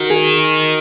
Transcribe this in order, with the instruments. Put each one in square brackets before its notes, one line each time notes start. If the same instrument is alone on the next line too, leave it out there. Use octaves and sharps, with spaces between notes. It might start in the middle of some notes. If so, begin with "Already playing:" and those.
Already playing: [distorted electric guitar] D#3 [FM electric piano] F#4
[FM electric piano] G#4